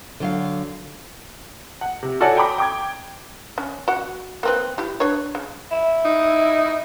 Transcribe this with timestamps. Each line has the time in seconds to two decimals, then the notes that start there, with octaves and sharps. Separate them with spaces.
0.20 D3 F#3 F5
1.81 F#5
2.03 C3
2.21 F#4 A4 C#5 D5 F#5 G#5
2.37 G5 A#5 B5 D6
2.58 G5 D6 G#6
3.58 C#4
3.88 F#4 F#5
4.43 A#3 C4 B4
4.78 E4 G4
5.00 D4 B4 C#5
5.35 C#3
5.72 E4
6.05 D#4